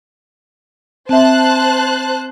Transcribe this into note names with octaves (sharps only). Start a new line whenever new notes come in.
C4 C5 E5 A5 F#6